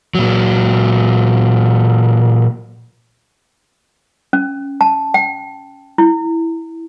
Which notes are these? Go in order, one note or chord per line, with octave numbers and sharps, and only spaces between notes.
A#2 F#3
C#4
A5
G5
E4